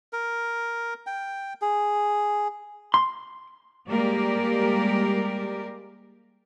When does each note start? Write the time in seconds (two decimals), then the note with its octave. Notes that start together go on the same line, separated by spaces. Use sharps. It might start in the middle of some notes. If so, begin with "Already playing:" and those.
0.13 A#4
1.06 G5
1.61 G#4
2.94 C6
3.88 G3 G#3 A#3 G4 A#4 D5